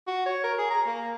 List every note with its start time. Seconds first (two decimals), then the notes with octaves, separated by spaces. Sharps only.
0.07 F#4
0.26 C#5
0.44 A#4
0.58 G#4
0.70 A#5
0.86 A#3